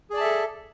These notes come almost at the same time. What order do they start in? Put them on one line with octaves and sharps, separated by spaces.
G#4 D5 A5 E5 A4